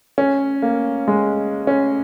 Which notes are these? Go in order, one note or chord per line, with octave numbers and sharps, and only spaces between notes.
C#4
A#3
G#3
C#4